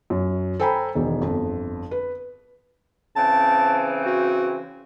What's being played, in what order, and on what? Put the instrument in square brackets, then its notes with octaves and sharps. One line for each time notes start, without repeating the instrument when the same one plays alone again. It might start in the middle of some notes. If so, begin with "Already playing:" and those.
[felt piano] F#2
A4 C5 G5 G#5 A#5 B5
E1 D#3
G1 F2
B4
[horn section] C#3 E3 C4 [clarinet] A5
[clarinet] F#4